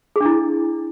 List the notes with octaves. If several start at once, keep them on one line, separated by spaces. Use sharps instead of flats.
D4 E4 G#4